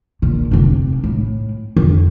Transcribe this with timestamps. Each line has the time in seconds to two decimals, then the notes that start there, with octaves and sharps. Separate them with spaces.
0.22 A#2
0.51 F1 C3
1.04 A2
1.76 F2